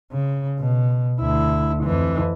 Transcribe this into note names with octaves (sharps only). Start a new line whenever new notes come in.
C#3
B2
D2 E4
F2 E3